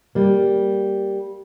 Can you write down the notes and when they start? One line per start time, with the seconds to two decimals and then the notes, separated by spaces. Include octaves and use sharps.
0.15 G3 A#3